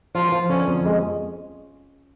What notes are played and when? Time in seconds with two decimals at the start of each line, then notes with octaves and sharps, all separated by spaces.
0.15 F3 F4
0.32 F3
0.49 D3 C#4
0.68 F2
0.86 G#3